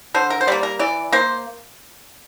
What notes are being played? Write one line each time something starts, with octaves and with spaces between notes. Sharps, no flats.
D3 C5
A#4
C5
G3 A#3 D5
A#4
E3 D5
A#3 C5